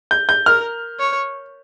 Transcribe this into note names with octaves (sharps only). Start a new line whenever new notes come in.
G6
G6
A#4 F6
C#5